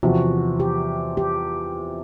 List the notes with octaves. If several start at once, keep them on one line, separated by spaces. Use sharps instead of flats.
E2 C3 F3 F#4
G4
G4